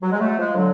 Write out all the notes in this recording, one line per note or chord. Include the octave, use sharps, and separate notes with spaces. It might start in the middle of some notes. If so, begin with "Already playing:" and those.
F#3
G#3
F#3 A3
F3 G#3
D3 F#3